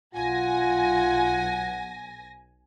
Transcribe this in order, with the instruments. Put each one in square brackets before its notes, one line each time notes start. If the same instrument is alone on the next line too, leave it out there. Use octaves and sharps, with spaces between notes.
[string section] B1 G#5 A#6 [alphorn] F4 [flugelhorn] F#5